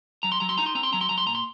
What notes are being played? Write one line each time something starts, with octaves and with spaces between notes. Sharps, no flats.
F#3 A#5
C6
F#3 A#5
C6
D#4 A#5
C6
C4 A#5
C6
F#3 A#5
C6
F#3 A#5
C6
A#2 A#5
C6